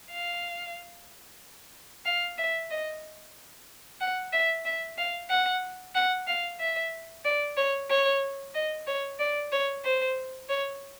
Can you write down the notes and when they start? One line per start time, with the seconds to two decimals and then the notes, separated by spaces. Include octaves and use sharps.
0.11 F5
2.05 F5
2.38 E5
2.71 D#5
4.01 F#5
4.33 E5
4.65 E5
4.98 F5
5.30 F#5
5.95 F#5
6.27 F5
6.60 E5
7.25 D5
7.57 C#5
7.90 C#5
8.55 D#5
8.87 C#5
9.19 D5
9.52 C#5
9.85 C5
10.49 C#5